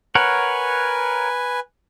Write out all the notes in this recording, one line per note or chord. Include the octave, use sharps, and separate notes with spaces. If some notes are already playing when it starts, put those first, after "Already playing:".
A#4 B4 C#5 F#5 G#5